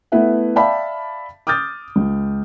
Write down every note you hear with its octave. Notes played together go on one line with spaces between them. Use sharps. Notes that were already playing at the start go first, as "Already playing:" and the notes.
A3 B3 E4 B4 E5 F#5
D5 E5 F5 G5 A5 B5
D6 D#6 F6 G6 A6
C#2